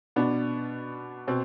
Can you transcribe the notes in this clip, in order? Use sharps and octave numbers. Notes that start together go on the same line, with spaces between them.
B2 B3 D4
B2 C4